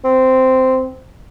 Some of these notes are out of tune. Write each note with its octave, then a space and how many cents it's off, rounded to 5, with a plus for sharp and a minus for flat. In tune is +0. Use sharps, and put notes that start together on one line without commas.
C4 -10